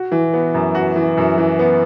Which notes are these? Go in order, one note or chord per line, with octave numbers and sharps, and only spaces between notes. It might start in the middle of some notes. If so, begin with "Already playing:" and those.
Already playing: F#4
E3
B3
F#2
F#4
E3
F#2
E3
B3